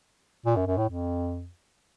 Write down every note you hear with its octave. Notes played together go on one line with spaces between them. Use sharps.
A#2
F#2
F#2
A2
F2